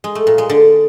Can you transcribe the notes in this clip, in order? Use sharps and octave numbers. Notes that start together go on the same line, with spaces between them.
G#3
A3
A#2
G#3
D3